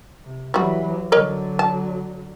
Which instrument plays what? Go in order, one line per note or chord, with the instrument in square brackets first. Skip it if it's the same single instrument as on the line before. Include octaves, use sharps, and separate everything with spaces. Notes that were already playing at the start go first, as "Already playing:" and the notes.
[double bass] C3
[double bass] E3 F#3 [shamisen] G3 F#4
[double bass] D3 F#3 [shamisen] A#4 C#5 D#5
[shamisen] A5